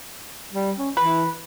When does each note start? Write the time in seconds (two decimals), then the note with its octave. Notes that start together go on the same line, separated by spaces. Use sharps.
0.53 G3
0.78 C#4
0.97 E3 B4